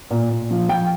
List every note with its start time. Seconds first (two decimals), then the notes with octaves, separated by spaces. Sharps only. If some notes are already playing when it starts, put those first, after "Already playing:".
0.11 A#2
0.30 A#2
0.51 F3
0.69 F3 G5